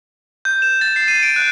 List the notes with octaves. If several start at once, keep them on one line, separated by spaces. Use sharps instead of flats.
G6
E7
A6
C7
D#7
D7
F#6